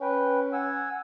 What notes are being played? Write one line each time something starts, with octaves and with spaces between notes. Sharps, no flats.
C#4 B4 G5
F#5 G#5 E6